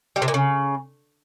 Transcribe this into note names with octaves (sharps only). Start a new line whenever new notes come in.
G3
C3
A#2
C#3